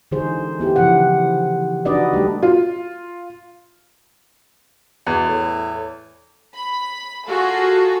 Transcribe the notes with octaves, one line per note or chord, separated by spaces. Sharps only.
D3 E3 D#4 G#4 C5
B3 E4 G4
C#3 E3 F3 F#5
D4 D#4 F#4 B4 D5 D#5
G3 A3 D#4 G4
F4
E2 B2
A2
B5
F4 F#4 G#4 A4